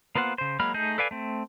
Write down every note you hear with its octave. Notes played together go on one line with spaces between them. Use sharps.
A#3 B3 F4 C5 F#5
C#3 C5
F#3 G#3 A#3 B5 F6
A3 D#4 G#4 G6
A4 B4 D5 F5 G#5
A3 C4